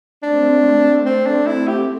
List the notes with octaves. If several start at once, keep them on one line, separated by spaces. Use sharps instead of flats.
A3 C4 D4
C4
D4
E4
G4